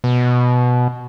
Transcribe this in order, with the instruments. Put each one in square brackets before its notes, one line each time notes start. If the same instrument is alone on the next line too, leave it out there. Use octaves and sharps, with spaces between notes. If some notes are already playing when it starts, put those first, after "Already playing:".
[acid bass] B2